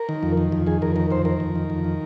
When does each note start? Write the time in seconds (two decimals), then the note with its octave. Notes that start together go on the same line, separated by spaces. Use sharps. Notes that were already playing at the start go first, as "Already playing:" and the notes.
Already playing: A#4
0.09 D#3
0.23 F2
0.37 D#3
0.52 F2
0.67 D#3 G#4
0.82 F2 A#4
0.96 D#3 A#4
1.10 F2 C5
1.25 D#3 A#4
1.40 F2
1.56 D#3
1.70 F2
1.85 D#3